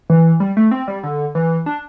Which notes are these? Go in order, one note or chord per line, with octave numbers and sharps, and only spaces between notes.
E3
G3
A3
C4
G3
D3
E3
D4